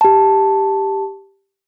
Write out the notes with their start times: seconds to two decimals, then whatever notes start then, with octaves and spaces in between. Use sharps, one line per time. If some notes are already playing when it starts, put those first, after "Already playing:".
0.01 G4 A5